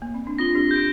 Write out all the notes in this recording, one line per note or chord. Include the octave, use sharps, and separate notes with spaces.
A#3
C4
D4
C4 F4 A#6 G7
D4 G4
G6 A#6 D7